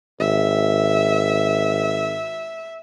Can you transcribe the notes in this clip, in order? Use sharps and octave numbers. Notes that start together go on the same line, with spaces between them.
G#1 E5